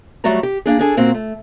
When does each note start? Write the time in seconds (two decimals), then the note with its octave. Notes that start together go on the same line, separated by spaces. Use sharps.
0.24 F#3 G3 A3 F#4 D5 A#5
0.43 G4
0.66 A#3 D4 G#4
0.79 D4 G#4 A4
0.97 A#2 A#3 C4 F#4
1.14 A3